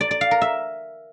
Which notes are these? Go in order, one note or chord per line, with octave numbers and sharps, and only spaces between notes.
D5
D5
F5
A#4
E5